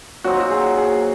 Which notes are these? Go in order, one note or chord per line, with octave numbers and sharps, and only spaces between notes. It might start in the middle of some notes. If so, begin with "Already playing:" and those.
A#2 F#3 C4 D#4 F#4
F#4
G#4
G#4